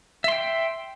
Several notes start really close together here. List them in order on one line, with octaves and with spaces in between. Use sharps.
E5 C6 G5